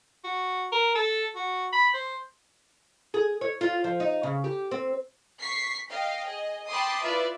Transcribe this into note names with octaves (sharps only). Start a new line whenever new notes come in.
F#4
A#4
A4
F#4
B5
C5
G#4
C#5
F4
F3
D#4
C#3
G4
C4
C#6 B6 C7
D#5 F5 G5
G#4 D#5
G5 A5 B5 C6 D6 D#6
E4 F4 B4 D5 E5